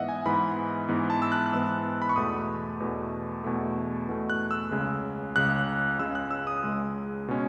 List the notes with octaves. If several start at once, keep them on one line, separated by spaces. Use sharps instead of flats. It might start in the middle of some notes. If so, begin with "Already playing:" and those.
Already playing: G#2 E3 B3 D#5 E5 F#5
G#5
G#2 E3 B3 B5
G#2 E3 B3
A5
E6
F#6
F#6
G#2 E3 B3 E6
B5
C#6
E2 B2 A3 D#6
E2 B2 A3
E2 B2 A3
E2 B2 A3
F#6
E6
C#2 C#3 G#3
C#2 C#3 G#3 F#6
C#2 C#3 G#3 E6
F#6
E6
D#6
C#2 C#3 G#3
B2 G#3 C#4